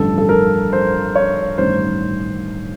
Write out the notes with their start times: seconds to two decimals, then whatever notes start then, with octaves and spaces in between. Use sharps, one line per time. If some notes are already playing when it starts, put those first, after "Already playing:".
Already playing: A1 G2 D3 F3 A4
0.18 A4
0.29 A#4
0.73 C5
1.15 C#5
1.58 A1 G2 D#3 C5